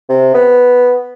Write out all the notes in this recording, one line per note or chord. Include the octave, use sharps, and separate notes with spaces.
C3
B3